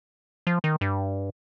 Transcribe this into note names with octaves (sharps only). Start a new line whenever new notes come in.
F3
D#3
G2